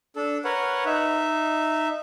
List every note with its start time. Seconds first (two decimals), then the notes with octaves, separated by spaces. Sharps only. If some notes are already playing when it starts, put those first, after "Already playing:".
0.16 D4 A4
0.44 A#4 B4 C#5 F#5
0.86 D#4 E5